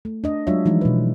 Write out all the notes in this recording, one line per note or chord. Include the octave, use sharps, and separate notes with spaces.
A3
D4 D#5
F#3 G#3 D4 F4 C#5 E5
E3 F3 G#3 D#4
B2 B4